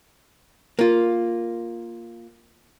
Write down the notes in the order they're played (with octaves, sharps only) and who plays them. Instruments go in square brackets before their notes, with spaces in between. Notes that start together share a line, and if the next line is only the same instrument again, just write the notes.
[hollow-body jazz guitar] A#3 F4